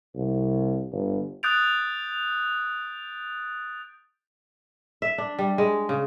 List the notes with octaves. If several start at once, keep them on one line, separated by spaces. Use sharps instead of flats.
C2
G1
D#6 F#6 G6 A6 D7 F7
E5
D4
G3
G#3
C#3